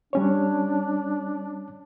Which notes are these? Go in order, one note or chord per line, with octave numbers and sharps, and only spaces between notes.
G3 C#4 D4 C#5